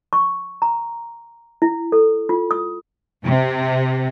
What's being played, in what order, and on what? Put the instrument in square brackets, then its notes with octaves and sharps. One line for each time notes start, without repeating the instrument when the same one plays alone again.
[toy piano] C#6
A#5
E4
A4
F4
D#6
[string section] C3